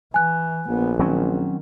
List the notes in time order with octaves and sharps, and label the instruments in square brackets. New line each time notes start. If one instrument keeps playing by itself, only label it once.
[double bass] E3 [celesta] G#5 F#6
[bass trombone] A#1 [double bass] B3
[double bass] D#3 [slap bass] F#3 C4 C#4